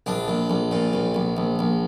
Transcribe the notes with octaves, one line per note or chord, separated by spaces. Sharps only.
A#1 D4
A#1
A#1
A#2
A#1
A#1
A#1
A#1